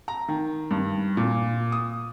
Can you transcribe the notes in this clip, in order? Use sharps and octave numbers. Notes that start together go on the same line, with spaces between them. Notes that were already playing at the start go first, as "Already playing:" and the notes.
A#5
D#3
G2
A#2
D#6